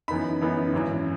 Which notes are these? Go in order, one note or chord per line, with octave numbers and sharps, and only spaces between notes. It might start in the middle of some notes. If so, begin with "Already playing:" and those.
F#2 E3 B3 D#4 B5
F#2 E3 B3 D#4
G#1 F#2 E3